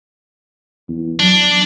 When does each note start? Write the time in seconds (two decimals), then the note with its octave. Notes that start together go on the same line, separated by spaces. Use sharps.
0.88 E2
1.20 F#3 D4